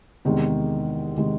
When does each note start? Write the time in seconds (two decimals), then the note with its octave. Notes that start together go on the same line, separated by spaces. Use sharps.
0.25 E2 C3 D#3 G#3
1.17 C3 D#3 G#3